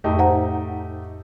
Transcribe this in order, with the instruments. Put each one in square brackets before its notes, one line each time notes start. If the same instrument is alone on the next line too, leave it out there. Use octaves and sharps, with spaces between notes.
[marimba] F2 A2 [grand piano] A3 D#4 G4
[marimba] C5 F#5 A#5